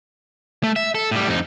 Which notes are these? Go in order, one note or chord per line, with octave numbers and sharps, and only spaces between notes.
A3
E5
A4
A2 G3
F2 D#4